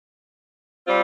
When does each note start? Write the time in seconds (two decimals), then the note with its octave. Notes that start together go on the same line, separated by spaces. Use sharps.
0.86 G3 C4 F4